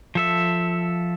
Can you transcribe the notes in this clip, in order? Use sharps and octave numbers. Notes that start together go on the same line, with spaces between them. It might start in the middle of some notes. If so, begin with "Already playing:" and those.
F3 A4 E5